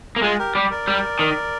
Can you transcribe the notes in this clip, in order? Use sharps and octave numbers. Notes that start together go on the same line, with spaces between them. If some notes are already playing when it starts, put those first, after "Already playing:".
A#3
G#3 F4 G#4
G4 A#4
G3
A#4 D5
G3
D#3